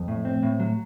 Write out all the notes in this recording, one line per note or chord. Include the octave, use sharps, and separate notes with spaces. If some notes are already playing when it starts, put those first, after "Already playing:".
Already playing: F2
A2
C4
A2
F#3